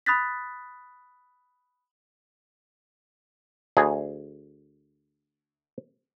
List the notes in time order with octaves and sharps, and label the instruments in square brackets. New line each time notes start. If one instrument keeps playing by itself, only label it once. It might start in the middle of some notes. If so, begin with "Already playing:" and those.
[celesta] B5 D#6 F#6 A6 B6
[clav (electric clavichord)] D2 G#4